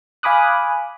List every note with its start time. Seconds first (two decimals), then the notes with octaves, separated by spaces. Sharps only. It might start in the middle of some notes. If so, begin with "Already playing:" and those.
0.23 F5 G#5 B5 D6 D#6 F#6